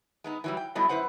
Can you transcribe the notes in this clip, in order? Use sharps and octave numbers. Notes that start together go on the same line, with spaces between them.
G#3 B3 D#4
E3 F#3 G3
G5
F#3 G3 A3 B3 E4 D#5
F#2 E4 B4 C5 F#5